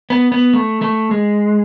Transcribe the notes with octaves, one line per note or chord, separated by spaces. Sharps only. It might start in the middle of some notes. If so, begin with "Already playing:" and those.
B3
B3
A3
A3
G#3